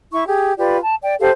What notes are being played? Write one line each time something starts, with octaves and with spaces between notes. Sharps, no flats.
E4 C#6
G4 G#4
F4 G4 B4 D5
A5
D5 G5
G4 A4 C5 F5